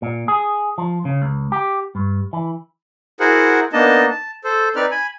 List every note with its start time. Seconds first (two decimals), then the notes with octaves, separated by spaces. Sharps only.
0.02 A#2
0.28 G#4
0.78 F3
1.05 C#3
1.22 C#2
1.52 G4
1.95 G2
2.33 E3
3.20 E4 F#4 G#4 A#4 C5 F#5
3.73 A#3 B3 D4 D#4 D#5 A5
4.10 A5
4.44 A4 C5
4.76 C4 D#4 B4 D5 F6
4.91 G#5 B5